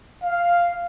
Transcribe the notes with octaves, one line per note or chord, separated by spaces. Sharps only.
F5